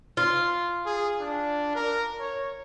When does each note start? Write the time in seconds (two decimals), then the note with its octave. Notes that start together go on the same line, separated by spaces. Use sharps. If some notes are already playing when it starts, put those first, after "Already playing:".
0.17 F4
0.86 G#4
1.21 D4
1.75 A#4
2.20 C#5